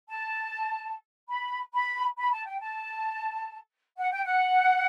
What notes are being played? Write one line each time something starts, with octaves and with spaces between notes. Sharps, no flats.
A5
B5
B5
B5
A5
G5
A5
F#5
G5
F#5